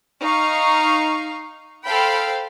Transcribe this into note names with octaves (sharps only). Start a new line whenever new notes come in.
D#4 F5 C#6
A4 C5 F5 G5 B5